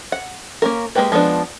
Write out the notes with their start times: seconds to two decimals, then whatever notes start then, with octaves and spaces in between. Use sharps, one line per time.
0.12 F#5
0.62 A#3 C#4 A#4
0.95 G#3 A#3 C#4 G4 B4
1.12 F3 G#3 B3 D4